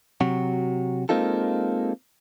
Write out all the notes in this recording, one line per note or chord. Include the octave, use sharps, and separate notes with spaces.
C3 F#3 F#4
G#3 A#3 C4 D#4 F4 A4